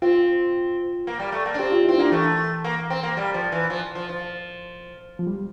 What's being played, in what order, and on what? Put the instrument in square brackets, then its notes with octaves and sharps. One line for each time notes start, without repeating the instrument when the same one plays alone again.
[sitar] C4 [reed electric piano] F4
[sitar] A#3
G3
A3
A#3
D4
[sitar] C4 [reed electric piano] G4
[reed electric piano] F4
E4
[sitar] C4
[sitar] A#3 [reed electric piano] D4
[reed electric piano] E3 [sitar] A3
[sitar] A#3
C4
A#3
G3
F3
E3
F3
F3
F3
[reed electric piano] F3
G3